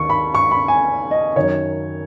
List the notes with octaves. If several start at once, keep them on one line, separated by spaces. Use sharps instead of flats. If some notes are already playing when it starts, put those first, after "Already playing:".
Already playing: D#2 D#3 C#6
B5
C#6
B5
G#5
D#5
F#2 D#3 C#5